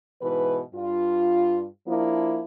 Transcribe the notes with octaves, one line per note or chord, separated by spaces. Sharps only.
G#2 B2 E3 B4
G2 F4
F3 A#3 D4 E4